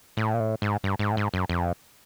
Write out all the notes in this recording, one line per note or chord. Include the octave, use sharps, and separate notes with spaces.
A2
A#2
A2
G#2
G2
G#2
A2
G#2
F#2
F2